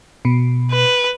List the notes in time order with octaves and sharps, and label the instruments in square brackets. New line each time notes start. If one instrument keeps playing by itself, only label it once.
[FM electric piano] B2
[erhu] B4